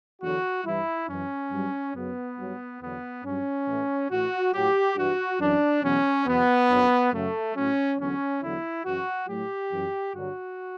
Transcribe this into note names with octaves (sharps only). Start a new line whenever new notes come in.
E2 D3 F#3 F#4
G2 E3 E4
F#2 E3 C#4
G2 F#3
F#2 C#3 F#3 B3
G2 F#3
E2 D3 F#3 B3
G2 F#3 C#4
A2 E3
A2 E3 F#4
A2 F#3 G4
G2 E3 F#4
F#2 E3 D4
E2 B2 F#3 C#4
E2 B2 F#3 B3
F#2 D3 F#3
F#2 C#3 F#3 A3
A2 F#3 C#4
E2 D3 F#3 C#4
E2 D3 F#3 E4
F#2 C#3 E3 F#4
A2 F#3 G4
F#2 E3
G2 D3 F#3 F#4